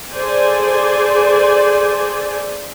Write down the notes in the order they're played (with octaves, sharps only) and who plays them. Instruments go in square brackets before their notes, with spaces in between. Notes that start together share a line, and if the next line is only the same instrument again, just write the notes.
[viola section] G#4 A4 C5 D5 G#5